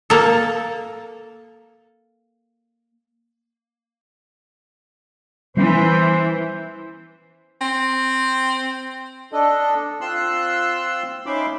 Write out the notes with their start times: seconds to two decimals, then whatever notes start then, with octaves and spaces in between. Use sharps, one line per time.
0.10 A#3 A4
5.57 E3 G3 B3 C#4 C5
7.61 C4
9.33 D4 A4 D#5
10.01 C4 F4 C6 E6 F#6
11.26 C#4 D#4 E5 B5 C6 D6